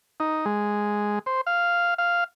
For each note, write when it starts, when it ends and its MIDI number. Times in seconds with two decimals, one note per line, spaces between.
0.20 0.45 63
0.46 1.19 56
1.26 1.41 72
1.47 1.94 77
1.98 2.24 77